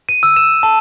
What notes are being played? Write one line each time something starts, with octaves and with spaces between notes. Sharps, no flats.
D#7
E6
E7
A5